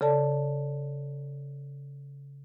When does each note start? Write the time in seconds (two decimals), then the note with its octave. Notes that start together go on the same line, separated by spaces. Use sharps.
0.01 C#3 A4 D5 A5